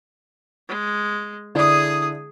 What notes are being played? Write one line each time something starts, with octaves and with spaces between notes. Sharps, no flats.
G#3
D3 D4 E4 G#4 D#6